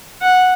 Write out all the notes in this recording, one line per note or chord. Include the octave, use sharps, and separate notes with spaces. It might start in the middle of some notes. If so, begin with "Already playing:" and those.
F#5